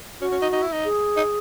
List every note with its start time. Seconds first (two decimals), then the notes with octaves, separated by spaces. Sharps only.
0.21 C#4 F#4
0.32 C#4
0.42 D#4
0.53 D#4
0.62 E4
0.73 D#4
0.85 G#4
1.17 D#4